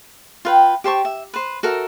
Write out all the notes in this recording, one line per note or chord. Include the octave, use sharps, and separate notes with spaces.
F4 B4 G5
G4 C5 A5 C#6
E5
B4 C5
F#4 A4 A#4 E5